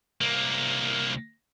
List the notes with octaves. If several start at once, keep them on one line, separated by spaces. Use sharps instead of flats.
C2 A#3